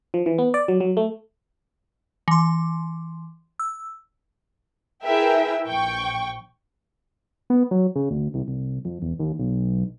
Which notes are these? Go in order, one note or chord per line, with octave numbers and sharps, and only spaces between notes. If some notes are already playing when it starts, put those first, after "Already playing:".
F3
E3
B3
D5
F#3
F#3
A3
E3 C6
E6
E4 G#4 A#4 B4 E5 G5
A#1 G5 C#6
B3
F#3
C#3
D2
C2
C2
F2
E1
D#2
B1